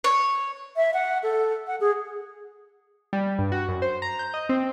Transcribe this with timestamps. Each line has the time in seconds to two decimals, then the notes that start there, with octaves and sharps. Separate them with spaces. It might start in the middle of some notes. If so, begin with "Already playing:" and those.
0.04 C#5
0.76 E5
0.94 F#5
1.23 A4
1.67 F#5
1.80 G#4
3.13 G3
3.39 G2
3.52 F#4
3.69 F#2
3.82 C5
4.02 A#5
4.19 G6
4.34 D#5
4.49 C4